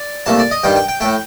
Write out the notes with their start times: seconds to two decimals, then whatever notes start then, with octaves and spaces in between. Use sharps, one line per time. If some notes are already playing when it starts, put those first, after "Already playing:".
Already playing: D5
0.26 C2 A#2 A3 A5
0.39 D5
0.51 D#5
0.64 G2 D#3 G3 G5
0.76 G5
0.88 G5
1.01 A2 A3 G5